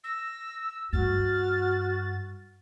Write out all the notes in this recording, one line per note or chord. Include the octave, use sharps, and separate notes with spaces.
E6 A#6
G2 F#4 F6 A6